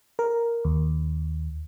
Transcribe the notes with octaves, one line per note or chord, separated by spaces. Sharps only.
A#4
D#2